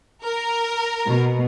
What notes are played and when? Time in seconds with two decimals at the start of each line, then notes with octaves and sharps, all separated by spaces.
0.23 A#4
1.08 B2